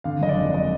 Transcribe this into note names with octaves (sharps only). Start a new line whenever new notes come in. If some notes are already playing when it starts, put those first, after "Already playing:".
D3 F5
F#1 D#5
D5
F2
D#5